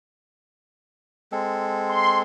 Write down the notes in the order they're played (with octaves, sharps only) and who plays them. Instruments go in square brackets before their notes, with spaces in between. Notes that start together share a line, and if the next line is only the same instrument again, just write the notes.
[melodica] G#3 C4 A4
[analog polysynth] C6